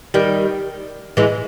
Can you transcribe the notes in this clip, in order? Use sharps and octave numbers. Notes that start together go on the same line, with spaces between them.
D#3 G3
E3 G#3